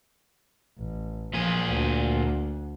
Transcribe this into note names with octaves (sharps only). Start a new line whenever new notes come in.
A1
A#2 F3 G#4
D2